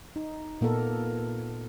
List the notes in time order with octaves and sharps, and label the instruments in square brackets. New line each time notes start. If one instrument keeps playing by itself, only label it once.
[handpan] D#4
A#2 A#3 B3 A4 A#4